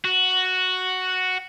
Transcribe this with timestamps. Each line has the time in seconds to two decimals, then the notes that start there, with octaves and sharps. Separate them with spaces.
0.05 F#4